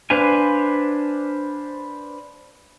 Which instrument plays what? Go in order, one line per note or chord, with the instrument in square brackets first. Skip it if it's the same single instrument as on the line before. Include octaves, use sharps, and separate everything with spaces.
[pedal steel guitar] D4 B4 C5 F5 G#5